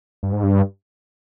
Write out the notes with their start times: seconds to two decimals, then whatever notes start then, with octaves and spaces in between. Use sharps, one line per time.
0.23 G2
0.33 G#2
0.43 G2